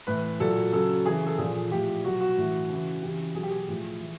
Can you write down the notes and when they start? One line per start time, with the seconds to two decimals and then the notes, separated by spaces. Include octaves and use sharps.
0.07 A2 E3 B4
0.40 A#2 F#3 A4
0.73 C#3 F#3 A4
1.05 C#3 E3 G#4
1.26 A4
1.38 A#2 F3 G#4
1.71 A2 F3 G4
2.04 B2 F#3 F#4
2.21 F#4
2.37 A2 E3
2.70 C#3 E3
3.02 C#3 E3 G4
3.35 B2 F#3 G#4
3.43 G4
3.50 G#4
3.68 A2 F3
4.00 E3